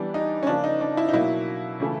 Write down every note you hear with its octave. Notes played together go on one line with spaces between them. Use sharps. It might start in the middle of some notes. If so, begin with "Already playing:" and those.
Already playing: E3 G3 B3 D4
D#4
C#4
C#3 F3 A#3 D4
D#4
D4
E4
D#4
B2 F#3 A#3 E4
C#3 E3 A3